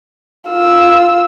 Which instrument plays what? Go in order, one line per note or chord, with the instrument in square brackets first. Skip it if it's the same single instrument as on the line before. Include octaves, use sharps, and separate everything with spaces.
[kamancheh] F4 E6